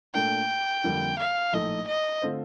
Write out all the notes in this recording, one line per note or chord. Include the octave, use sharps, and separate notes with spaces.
A#2 A3 D4 G5
F2 D3 G3 A#3
F5
A#1 A2 A3 D#4 A4 D#5
D#5
D3 A3 C4 F4 C5